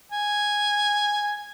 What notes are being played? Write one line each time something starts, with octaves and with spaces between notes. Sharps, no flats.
G#5